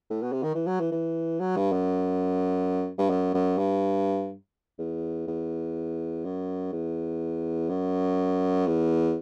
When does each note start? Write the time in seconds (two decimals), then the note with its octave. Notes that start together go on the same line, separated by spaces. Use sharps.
0.10 A2
0.22 B2
0.32 C3
0.43 D#3
0.55 E3
0.67 F#3
0.80 E3
0.92 E3
1.40 F#3
1.56 G2
1.72 F#2
2.99 G2
3.10 F#2
3.34 F#2
3.58 G2
4.79 E2
5.27 E2
6.24 F#2
6.73 E2
7.69 F#2
8.67 E2